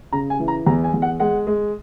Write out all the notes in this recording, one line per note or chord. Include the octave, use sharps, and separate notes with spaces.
C#3 A#5
G#5
E3
A#5
E2 A#5
G#5
E2
F#5
G#3 F#5
G#3